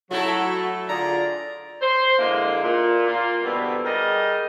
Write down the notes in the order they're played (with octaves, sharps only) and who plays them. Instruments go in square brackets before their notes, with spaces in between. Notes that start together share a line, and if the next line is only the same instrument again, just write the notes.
[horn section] F#3 [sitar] A3 E4 A4 [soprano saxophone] F#4
[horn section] D3 F4 G#4 [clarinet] D5 [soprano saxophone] A#5
[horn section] C5
D3 E3 G#3 A#3
A#2
A#3 F4
B2 D3 E3 G3 B3 C4
G3 G#4 A#4 D#5